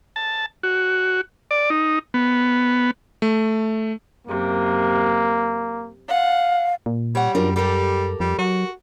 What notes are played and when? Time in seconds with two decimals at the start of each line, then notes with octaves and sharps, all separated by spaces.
0.16 A5
0.63 F#4
1.51 D5
1.70 D#4
2.14 B3
3.22 A3
4.27 F#2 C3 A#3
6.09 F5 F#5
6.86 A#2
7.15 G3 C#5 F#5
7.35 F#2 D4 F4 A#4
7.56 G3 G4 A4 A#4
8.20 F2 G3
8.39 F#3 F#4